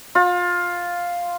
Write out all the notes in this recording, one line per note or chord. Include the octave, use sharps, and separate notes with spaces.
F4